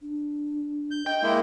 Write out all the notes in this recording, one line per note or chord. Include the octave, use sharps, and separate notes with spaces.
D4
G6
D#5 G5
G#3 A#3 E4